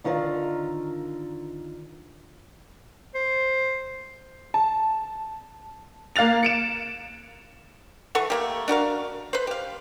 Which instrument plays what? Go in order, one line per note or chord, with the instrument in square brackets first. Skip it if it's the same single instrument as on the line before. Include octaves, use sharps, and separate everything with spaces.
[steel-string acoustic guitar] D3 D#3 F4 A#4 B4 D5
[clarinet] C5
[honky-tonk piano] A5
A#3 F5 F#6 A6 F7
C#7 D7 E7
[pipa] E3 A4 F#5 C#6
A3 A#3 G4
D4 F#4 A#4 F5
B4 C5
G4 F5